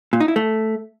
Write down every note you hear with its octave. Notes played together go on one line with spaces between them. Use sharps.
A#2
D#4
E4
A3